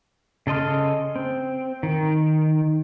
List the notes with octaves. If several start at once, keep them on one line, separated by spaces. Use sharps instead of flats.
C#3 A4 D#5 C6 F6
C4
D#3